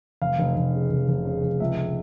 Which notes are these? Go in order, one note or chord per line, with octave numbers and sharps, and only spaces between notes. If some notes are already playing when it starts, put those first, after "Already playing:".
F1 F5
F1
F1
C#3
F1
F1
C#3
F1
C#2 E5